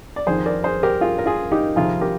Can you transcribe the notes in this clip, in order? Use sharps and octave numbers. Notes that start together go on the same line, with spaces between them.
D5
F2 D#3 G#4 C5
A#4 D5
G#4 C5
G4 A#4
F4 G#4
A#4
F4 G#4
D#4 G4
F2 C3 D#3 F4 G#4
G4 A#4